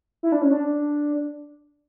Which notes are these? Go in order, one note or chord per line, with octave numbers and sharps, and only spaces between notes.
E4
D4
C#4
D4